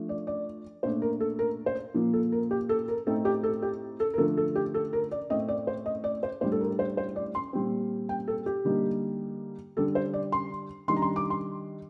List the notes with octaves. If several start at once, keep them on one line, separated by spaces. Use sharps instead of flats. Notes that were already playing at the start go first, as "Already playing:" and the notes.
Already playing: F3 A3 D4
D5
D5
A#2 A3 D4 C5
A#4
A4
A#4
C5
A#2 F3 A#3
A4
A#4
G4
A4
A#4
A2 A3 C4 D#4 A4
G4
A4
G4
A4
A#4
D3 F3 A3 D4 A4
A4
G4
A4
A#4
D5
A2 A3 C4 D#5
D5
C5
D#5
D5
C5
A2 G3 D4 C5
A4
A#4
C5
C5
D5
C6
A#2 G3 C4
G5
A4
G4
D3 G3 A#3 D#4
D3 G3 D4 A4
C5
D5
C6
D#3 G3 D4 C6
A#5
C6
D6
C6